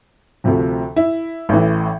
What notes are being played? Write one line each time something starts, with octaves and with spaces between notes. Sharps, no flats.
D2 C3 F3
E4
A1 A2 E3